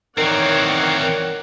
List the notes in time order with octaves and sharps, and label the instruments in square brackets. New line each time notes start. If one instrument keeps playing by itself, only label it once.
[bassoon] D#3 [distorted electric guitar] E3 C4 [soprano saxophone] A#4 [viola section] C#5 D5 F#5